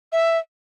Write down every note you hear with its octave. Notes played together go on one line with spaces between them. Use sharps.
E5